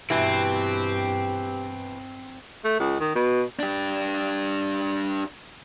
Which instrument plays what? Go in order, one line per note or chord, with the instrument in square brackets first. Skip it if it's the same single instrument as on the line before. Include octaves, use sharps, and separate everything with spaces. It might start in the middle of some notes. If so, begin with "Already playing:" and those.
[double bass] G2 [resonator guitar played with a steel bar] B2 E3 [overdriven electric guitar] C4 [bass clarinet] G4
[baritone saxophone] A3
C#2
D#3
B2
[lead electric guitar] D4 G4